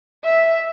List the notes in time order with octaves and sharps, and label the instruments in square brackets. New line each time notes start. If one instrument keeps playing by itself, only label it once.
[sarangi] E5